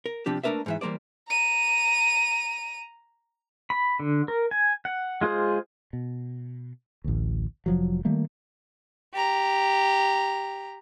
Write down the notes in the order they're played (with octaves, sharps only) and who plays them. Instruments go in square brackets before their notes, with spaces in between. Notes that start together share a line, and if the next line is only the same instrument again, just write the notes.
[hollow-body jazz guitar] A#4
C3 F3 D4 G4
A3 A#3 D4 A#4 B4 E5
G#2 E3 E5
E3 G3 A#3 C5 D5
[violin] A#5 D#7
[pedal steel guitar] B5
D3
A#4
G#5
F#5
G#3 F4 G#4 C5
[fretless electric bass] B2
A1 D2
F1 F3 F#3
D#3 G3 A3 A#3
[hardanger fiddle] G4 A#5